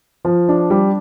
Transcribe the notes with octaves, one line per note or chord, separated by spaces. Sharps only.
F3
D4
G3